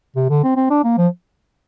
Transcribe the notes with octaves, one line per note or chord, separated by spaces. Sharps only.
C3
D3
C4
C4
D4
A#3
F3